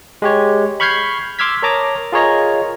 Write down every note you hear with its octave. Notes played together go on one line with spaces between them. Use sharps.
G#3 G4 C#5
B5 C#6 F6 G6 G#6 C7
C6 D6 E6 F6 G#6 B6
A#4 C#5 A5 A#5 D6 D#6
F4 G#4 A#4 C#5 D#5 A#5